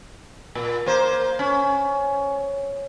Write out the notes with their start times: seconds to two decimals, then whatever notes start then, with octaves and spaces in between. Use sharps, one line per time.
0.55 A#2
0.86 A#3 C5
1.39 C#4